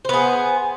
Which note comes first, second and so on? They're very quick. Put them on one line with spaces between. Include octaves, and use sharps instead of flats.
C5 B3 G#4